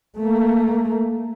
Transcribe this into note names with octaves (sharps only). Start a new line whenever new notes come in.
A3 A#3